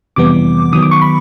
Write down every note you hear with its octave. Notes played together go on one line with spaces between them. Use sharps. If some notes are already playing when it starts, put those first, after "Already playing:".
F2 C3 E3 G3 B3 D6
D#3 F#3 B3 D#6
D6
C#6
B5